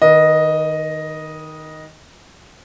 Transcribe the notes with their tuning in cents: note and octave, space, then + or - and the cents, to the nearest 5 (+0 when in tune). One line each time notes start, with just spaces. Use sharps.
D#3 +0 B4 -40 D#5 +0